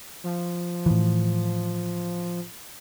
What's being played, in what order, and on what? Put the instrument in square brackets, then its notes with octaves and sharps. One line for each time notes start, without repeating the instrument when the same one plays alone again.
[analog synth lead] F3
[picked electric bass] A2 E3